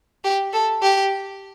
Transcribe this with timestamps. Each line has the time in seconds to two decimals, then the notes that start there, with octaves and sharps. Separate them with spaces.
0.24 G4
0.53 A4
0.82 G4